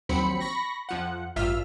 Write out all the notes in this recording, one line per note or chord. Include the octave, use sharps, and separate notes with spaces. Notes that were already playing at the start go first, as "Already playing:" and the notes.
A#1 D#2 F#3 C4 B5 C#7
B5 C#6 A#6
F2 F3 F#5
A1 G2 F4 E5 F6 B6